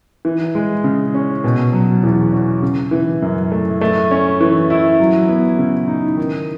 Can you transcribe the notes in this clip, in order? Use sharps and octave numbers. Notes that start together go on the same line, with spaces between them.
E3
G#3
C#3
C#4
B2
F#3
E2
C#4
C#3
E3
F#2
A3
A3
C#4
E3
E4
F#3
B3
C#3
D#4
D#3